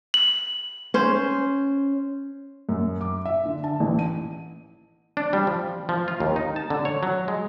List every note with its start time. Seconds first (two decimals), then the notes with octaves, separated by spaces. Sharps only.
0.14 F#7
0.94 C#4 C5
2.69 F#2
3.01 D6
3.25 E5
3.45 D3
3.64 A5
3.80 A1
3.99 D#7
5.17 D4
5.33 G3
5.47 F3
5.89 F3
6.08 F4
6.20 D#2
6.36 D#4
6.56 A5
6.70 D3
6.85 C#5
7.03 F#3
7.28 G#3